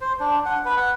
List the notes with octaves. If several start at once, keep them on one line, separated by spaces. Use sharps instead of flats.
C5
D4
F#5
B4
F#5